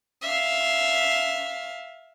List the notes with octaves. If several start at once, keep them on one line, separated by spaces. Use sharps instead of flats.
E5 F5